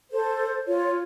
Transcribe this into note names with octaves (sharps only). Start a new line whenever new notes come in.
A4 C5
F4 C#5